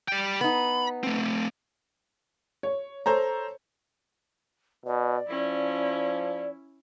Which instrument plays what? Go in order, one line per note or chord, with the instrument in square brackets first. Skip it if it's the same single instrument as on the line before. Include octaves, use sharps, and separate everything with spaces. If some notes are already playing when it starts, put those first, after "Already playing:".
[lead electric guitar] G3 G5
[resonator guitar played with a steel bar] B3 D#4 [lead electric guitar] B5
[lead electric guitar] A3 C4
[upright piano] C#5
A4 C5 C#5 A#5
[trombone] B2 [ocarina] D5
[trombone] F3 [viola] C#4 E4